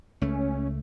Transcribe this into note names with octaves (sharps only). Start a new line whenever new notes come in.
C#2 A3 C#4